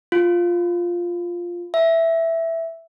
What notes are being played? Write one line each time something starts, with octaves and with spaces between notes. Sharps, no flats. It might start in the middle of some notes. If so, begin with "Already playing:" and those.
F4
E5